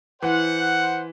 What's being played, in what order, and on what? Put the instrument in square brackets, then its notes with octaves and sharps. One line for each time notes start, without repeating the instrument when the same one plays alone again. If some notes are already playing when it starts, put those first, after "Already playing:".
[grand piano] E3 [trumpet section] C5 F#5